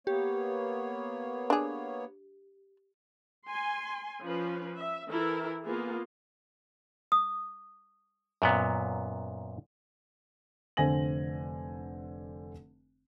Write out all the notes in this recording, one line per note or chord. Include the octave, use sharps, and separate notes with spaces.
A#3 B3 G4 C#5
D4 G#4
G#5 C6
F3 C#4 B4
E5
E3 E4 A4 A#4
A#3 B3 F4 G#4
D#6
F#2 A#2 B3
F1 D3 C4 G#5 A#6 F#7